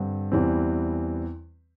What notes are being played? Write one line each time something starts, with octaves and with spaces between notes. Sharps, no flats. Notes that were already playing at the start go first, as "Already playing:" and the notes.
Already playing: G2 D3 C4
E2 E3 G3 C4